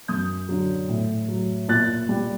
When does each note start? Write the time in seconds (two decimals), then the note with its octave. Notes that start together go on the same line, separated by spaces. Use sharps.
0.08 F#2 D#6 G6
0.49 D3 F#3
0.89 A2
1.28 F#3
1.68 A#2 F#6 A6
2.09 G3